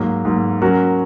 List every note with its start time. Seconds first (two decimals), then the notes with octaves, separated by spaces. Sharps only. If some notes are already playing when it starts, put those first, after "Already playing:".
Already playing: G#2 F#3 A#3
0.25 G#2 F#3 A#3
0.62 F#3 C#4 F#4 A#4